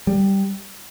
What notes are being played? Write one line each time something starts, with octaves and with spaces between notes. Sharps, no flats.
G3